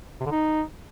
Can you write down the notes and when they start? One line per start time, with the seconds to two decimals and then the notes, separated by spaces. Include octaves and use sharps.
0.20 C3
0.26 D3
0.31 D#4